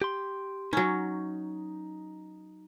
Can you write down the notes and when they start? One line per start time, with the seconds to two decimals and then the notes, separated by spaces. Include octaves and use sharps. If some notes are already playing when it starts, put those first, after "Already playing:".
0.02 G4 C6
0.73 F#3 C#4 D#4